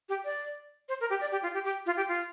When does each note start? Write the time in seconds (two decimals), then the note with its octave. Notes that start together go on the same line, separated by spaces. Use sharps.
0.09 G4
0.25 D5
0.89 C5
1.01 A#4
1.10 G4
1.21 D5
1.32 G4
1.43 F4
1.54 G4
1.65 G4
1.86 F4
1.97 G4
2.08 F4